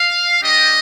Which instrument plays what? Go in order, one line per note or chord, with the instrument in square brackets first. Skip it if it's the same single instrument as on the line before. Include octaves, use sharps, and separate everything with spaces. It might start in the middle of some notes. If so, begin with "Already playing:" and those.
Already playing: [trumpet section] F5
G3 D4 G4 D#5